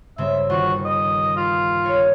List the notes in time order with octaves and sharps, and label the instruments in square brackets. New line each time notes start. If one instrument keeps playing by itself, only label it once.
[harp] G2 C#3 C4 [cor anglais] E5
[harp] G1 D#2 F4 [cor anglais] F#4
[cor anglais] D#5
F4
[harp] A#4 C#5